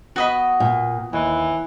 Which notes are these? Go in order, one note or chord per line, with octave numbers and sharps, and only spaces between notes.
B3 F#4 D#5 B5
A#2
D#2 E3